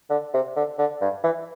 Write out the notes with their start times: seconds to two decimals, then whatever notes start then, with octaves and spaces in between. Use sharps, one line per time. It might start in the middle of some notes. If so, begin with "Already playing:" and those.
0.10 D3
0.34 C3
0.57 D3
0.79 D3
1.02 G2
1.24 E3